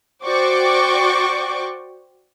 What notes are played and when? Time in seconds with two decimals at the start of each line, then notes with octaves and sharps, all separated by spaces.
0.25 F#4 C5 D5 G5 C#6 D6